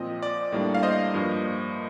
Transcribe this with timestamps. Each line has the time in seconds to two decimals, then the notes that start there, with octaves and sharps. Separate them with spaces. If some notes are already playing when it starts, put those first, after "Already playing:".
Already playing: A#2 F3 C4 D#5
0.23 D5
0.52 A2 G3 A#3 D4
0.75 F5
0.83 C5 D#5
1.14 G2 F3 A#3